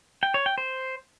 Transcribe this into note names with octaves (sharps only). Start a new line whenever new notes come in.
G5
C#5
G5
C5